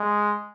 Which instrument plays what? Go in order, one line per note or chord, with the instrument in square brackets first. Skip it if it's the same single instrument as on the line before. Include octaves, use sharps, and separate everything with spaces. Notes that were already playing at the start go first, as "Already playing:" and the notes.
Already playing: [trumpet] G#3